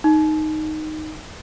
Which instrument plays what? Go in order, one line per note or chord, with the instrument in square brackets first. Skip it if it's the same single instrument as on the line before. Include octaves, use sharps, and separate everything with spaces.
[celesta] D#4